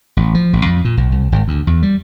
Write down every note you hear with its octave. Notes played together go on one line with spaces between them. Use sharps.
A1
F3
A1
F2
A#2
B1
C2
G#1
D2
E2
G3